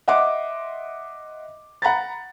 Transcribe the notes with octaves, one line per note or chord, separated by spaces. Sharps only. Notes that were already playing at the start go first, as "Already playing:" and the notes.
D#5 E5 F#5 C6 D6
F#5 A#5 B5 A6